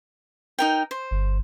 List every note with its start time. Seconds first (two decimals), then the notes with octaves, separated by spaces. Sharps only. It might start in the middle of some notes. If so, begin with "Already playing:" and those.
0.59 D#4 A#4 G5
0.91 C5
1.11 G1